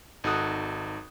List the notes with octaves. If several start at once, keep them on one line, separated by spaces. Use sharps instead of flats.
G#1 D#4 F#4 A4 D#6 F#6